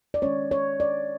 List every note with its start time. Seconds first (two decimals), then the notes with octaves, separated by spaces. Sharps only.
0.14 D5
0.22 D#3 G#3 C#4 C#5
0.51 C#5
0.80 D5